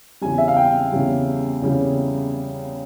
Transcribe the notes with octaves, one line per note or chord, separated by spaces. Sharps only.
E2 C#3 G3 G#5
E5
F5
G5
E2 C#3 G3
E2 C#3 G3